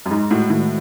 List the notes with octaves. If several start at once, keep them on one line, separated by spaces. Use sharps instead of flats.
F#2
G#2 G#3
A2 F#4
A2 D#3